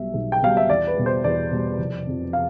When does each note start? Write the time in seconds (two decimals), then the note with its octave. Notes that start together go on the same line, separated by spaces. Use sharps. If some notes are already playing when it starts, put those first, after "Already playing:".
Already playing: B1 B2 G3 E5
0.14 B1
0.32 G5
0.42 B2 G3 F5
0.57 E5
0.70 E2 D5
0.87 B4
0.96 B2 G3
1.06 C5
1.24 E2 D5
1.51 B2 G3
1.79 F1
2.06 F2 C3
2.33 F5